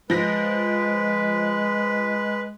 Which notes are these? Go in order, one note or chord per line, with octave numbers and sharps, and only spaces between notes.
F3 G#3 B4 A#6